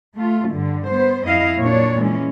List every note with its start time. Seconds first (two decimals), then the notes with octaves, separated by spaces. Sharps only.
0.15 A3 F4
0.52 G2 D3
0.89 B3 C5
1.25 F2 E4 D#5 F5
1.58 A#2 F#3 D4 C#5
1.98 E3 G#3 C#4